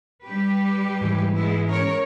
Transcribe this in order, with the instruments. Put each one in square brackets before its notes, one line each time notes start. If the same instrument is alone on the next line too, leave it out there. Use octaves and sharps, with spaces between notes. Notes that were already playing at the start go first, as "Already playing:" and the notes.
[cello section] G3 G4 B4
[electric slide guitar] G#2 E3
[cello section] G#3 B3 E4
C#4 A#4 C#5